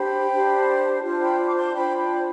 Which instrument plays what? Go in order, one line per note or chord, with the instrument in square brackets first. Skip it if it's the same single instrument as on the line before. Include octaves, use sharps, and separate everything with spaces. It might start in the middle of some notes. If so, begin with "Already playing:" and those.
Already playing: [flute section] D4 G4 C5 G5 B5
D4 G4 C5
D4 F4 C5
G5 B5
D6
A5 C6
D4 F4 C5 G5 B5
G5 B5